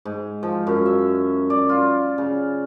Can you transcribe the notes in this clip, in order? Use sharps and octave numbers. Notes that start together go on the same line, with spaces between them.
G#2
F3
F#2
E5
D5
F4
C#3